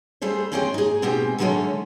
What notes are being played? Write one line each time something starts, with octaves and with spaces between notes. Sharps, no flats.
G3 A3 G#4 C5
G#3 C4 C#4 G#4 D5 G5
D#4 G#4
B2 G#3 C4 G4 G#4 G5
D3 D#3 F#3 G#3 A3 C#4